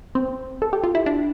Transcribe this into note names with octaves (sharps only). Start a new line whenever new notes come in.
C4
A4
G4
F4
E4
D4